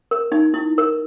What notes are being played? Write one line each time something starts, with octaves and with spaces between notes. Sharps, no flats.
A#4
D#4
E4
A#4